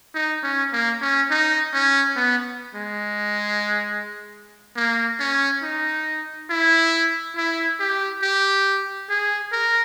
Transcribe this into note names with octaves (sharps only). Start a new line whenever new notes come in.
D#4
C#4
A#3
C#4
D#4
C#4
B3
G#3
A#3
C#4
D#4
E4
E4
G4
G4
G#4
A#4